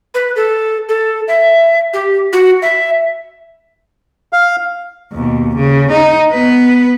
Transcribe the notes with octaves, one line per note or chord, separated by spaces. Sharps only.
B4
A4
A4
E5
G4
F#4
E5
F5
D#2 B2
C#3
D#4
B3 B4